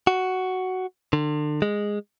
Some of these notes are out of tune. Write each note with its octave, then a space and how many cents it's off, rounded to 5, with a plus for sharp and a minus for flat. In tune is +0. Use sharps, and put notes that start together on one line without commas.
F#4 +5
D3 +35
G#3 -10